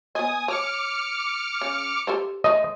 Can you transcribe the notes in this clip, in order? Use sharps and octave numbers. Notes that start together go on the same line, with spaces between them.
B3 D#5 G#5 D#6
C#5 A5 D6 F6 C#7
C#3
G4 A4 C5
G#3 A3 D#4 D#5